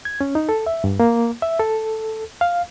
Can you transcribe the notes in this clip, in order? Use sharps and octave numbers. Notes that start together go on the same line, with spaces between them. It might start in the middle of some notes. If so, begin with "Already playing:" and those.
G#6
C#4
D#4
A4
E5
G2
A#3
E5
A4
F5